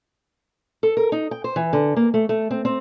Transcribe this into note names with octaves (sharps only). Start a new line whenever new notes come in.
A4
A#4
D#4
G5
C5
E3
D3
A#3
A3
A3
C4
C4